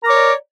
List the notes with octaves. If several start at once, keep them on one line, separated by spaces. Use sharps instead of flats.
A#4 C#5 D5 A#5 D6